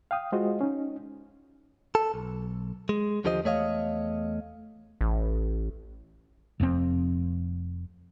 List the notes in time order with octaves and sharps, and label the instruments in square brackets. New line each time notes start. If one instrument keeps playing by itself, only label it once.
[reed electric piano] F5 G5 D#6
G#3 F4 F#4 G#4 C5 D#5
C#4 D#4
[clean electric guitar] A4
B1
G#3
D#2 D3 F3 G4 C5 D#5
E2 A3 C#5 D#5 F5
[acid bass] A1
[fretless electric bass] F1 F2 C3 C4